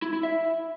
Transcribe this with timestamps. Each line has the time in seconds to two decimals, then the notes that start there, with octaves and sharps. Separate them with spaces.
0.02 E4
0.13 E4
0.23 E5